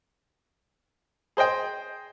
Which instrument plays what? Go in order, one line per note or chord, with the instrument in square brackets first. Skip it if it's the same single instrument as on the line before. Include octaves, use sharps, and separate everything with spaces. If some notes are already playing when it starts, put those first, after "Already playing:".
[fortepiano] G#4 C5 D#5 G5